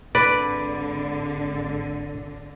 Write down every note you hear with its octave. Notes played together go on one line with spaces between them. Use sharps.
G#1 D3 B4 D5